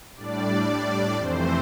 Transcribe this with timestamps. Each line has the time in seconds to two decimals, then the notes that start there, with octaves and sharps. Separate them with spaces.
0.17 A2 G3 D4 D5
1.16 F2 C3 E3 A3 C4 C5